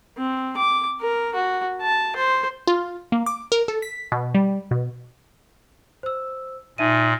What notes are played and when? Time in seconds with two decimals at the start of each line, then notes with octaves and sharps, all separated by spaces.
0.17 C4
0.57 D6
1.01 A#4
1.35 F#4
1.81 A5
2.16 C5
2.68 F4
3.12 A#3
3.26 D6
3.52 A#4
3.68 A4
3.82 B6
4.12 B2
4.35 G3
4.71 B2
6.03 C5 E6
6.78 A#2 D#4 E5 D#7